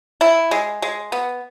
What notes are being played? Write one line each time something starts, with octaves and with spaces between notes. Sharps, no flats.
E4
G#3
G#3
B3